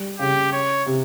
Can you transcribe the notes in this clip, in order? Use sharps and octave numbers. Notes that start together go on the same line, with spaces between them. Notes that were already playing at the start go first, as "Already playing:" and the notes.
Already playing: G3
C#3 G4
C#5
C3